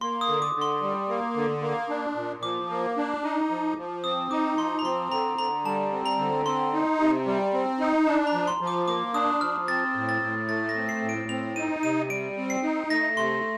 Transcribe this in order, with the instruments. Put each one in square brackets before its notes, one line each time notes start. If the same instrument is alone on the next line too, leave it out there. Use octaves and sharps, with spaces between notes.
[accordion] A#3 [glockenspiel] C6
[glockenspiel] D#6
[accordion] D3
[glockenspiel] D6
[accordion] D3
[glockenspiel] C6
[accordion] G3
A#3
D3
A#3
D4
A#2
[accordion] F3 [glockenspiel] D6
[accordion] A#3
D4
D#4
F3
F3
[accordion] C4 [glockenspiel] D#6
[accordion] D#4 [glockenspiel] D6
[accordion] F3 [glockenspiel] C6
[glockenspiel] A#5
[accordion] C4 [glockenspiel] C6
[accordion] D3 [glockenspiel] A#5
[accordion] D3 [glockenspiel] A#5
[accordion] G3 [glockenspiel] A5
[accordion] C4
[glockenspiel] A#5
[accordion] D3
[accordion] C4 [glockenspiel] C6
[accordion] D#4
C3
G3
C4
D#4
[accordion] D4 [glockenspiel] A5
[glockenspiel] A#5
[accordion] F3
[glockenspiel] C6
[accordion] F3
[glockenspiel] D6
[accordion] A#3 [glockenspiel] D6
[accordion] D4 [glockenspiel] D#6
[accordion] F3 [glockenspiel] F6
[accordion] C4 [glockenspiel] A6
[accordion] A2
[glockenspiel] A6
[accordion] A2
[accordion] A3 [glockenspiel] A6
[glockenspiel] A#6
[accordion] C4
[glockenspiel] C7
[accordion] A2
[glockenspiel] D7
[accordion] C4 [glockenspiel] F7
[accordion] D#4 [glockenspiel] D#7
[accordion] C3 [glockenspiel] D#7
[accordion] G3 [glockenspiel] D7
[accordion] C4
[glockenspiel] C7
[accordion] D#4
[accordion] A3 [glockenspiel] A#6
[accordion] C3 [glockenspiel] C6